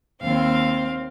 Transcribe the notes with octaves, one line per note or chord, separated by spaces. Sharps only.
D#2 C4 F5